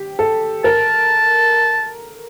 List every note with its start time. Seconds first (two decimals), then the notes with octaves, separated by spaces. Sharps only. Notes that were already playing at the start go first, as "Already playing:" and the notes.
Already playing: G4
0.19 A4
0.64 A#4 A5